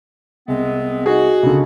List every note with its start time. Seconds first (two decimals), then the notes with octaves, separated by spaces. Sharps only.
0.48 C2 G#3 B3 C4
1.06 D#4 F#4 G#4
1.43 C#2 D3